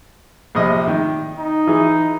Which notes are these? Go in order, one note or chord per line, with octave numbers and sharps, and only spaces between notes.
A#1 C3 D#5
D#3
D#4
E3 G#4